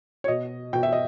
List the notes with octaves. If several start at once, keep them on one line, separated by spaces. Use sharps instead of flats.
C#5
B2 D#5
B2 G5
E5
D#5